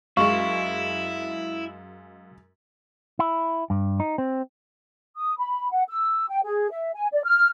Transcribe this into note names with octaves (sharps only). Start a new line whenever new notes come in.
F#2 G#3 E4 F5 C#6
E4
G2
D#4
C4
D#6
B5
F#5
E6
G5
G#4
E5
G#5
D5
F6